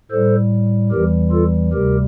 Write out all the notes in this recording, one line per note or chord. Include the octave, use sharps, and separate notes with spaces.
A2 G3 A4 C5
E2 E3 G3 G4 A#4
F4 A4
D2 C3 G3 G4 A#4